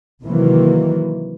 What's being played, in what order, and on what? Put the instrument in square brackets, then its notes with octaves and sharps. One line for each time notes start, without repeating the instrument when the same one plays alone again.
[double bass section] C3 D#3 E3 F#3 A#3